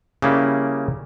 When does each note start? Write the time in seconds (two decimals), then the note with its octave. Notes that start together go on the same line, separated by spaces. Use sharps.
0.22 C#3 G3 A#3 E4 G4